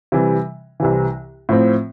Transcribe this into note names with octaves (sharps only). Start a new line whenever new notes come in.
C3 E3 G3
C2 C3 E3
A2 F3 C4